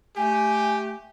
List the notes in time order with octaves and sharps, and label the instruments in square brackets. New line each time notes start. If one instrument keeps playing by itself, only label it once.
[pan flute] A3 [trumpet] G4 [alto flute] G#5